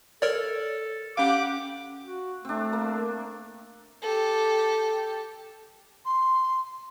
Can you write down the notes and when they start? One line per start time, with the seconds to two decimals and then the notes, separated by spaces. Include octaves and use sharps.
0.22 A4 A#4 C#5 D5
1.17 C#4 G4 F5 F#5 D6
2.02 F#4
2.45 A3 C4 D4
2.72 A#3 A#4
4.02 G4 A4
6.05 C6